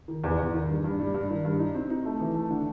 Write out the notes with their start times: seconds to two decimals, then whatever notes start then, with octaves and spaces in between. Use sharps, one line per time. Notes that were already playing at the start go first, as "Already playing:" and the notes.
0.08 D#3
0.24 E2
0.39 E2
0.54 D#3
0.69 G2
0.84 G2
1.00 G3
1.14 G2
1.30 D#3
1.45 G2
1.59 D#4
1.75 C4
1.90 D#4
2.05 A3
2.20 E3
2.35 A3
2.51 D3